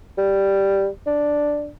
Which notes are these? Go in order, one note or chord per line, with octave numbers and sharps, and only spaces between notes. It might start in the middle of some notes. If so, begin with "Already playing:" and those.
G3
D4